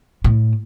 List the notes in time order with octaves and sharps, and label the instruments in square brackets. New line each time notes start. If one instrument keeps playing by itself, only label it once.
[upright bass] A2